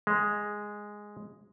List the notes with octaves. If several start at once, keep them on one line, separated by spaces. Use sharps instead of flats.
G#3